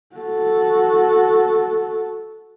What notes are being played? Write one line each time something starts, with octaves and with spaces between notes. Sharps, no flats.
F#4 A4